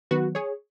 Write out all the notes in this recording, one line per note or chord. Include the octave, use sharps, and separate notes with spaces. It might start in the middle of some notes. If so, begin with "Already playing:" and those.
D#3 F#3 B3 F#4 B4
G#4 C#5